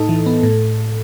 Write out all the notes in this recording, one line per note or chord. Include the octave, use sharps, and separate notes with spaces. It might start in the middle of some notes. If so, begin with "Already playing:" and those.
Already playing: A2 D#4 A4
E3
B3
A2